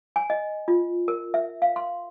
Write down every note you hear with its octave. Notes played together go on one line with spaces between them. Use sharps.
G#5
D#5
F4
A#4
E5
F5
C6